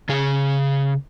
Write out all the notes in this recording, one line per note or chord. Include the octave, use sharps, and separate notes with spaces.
C#3 G#4